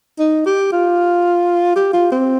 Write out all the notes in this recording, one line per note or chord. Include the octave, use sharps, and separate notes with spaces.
D#4
G4
F4
G4
F4
C4